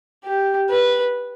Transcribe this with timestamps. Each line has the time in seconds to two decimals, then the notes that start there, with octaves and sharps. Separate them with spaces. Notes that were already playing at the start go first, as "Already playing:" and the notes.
0.24 G4
0.70 B4